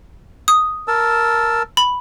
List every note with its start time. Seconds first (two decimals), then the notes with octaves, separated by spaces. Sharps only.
0.48 D#6
0.88 A#4 A5 E6
1.77 B5